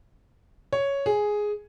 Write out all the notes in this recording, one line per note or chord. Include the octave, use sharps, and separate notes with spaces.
C#5
G#4